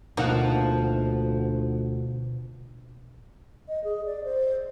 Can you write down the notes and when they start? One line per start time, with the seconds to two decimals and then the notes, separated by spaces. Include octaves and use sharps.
0.17 D2 B2 F3 A#3 D#4 F#5
3.68 D#5
3.84 G#4
4.05 D5
4.24 C5